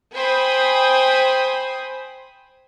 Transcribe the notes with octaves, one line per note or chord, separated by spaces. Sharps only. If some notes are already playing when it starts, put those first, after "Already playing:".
C5 G5 G#5 B5 D#6